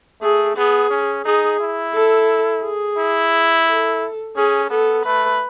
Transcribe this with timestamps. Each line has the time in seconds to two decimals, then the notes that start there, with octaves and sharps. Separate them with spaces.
0.22 A3 G#4
0.57 B3 G#4
0.90 C#4
1.25 D#4 G#4
1.60 E4
1.94 A4
2.63 G#4
2.98 E4
3.67 A4
4.36 C#4 G#4
4.70 B3 A4
5.05 A3 B4